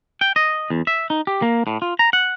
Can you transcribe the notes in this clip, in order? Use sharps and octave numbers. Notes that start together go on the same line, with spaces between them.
G5
D#5
E2
E5
D#4
G4
A#3
A2
F4
A#5
F#5